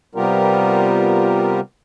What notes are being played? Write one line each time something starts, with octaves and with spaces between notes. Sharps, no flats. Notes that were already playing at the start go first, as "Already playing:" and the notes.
C3 G3 B3 F4 G4 A#4